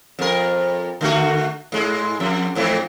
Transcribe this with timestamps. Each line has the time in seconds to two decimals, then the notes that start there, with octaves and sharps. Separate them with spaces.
0.19 F2 A#4
1.01 D3 A3 F#4
1.72 G#2 G#3
2.20 F2
2.55 F2 G#2 E3